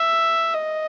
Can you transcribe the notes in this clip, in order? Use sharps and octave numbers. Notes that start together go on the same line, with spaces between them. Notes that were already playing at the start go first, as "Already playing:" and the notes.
Already playing: E5
D#5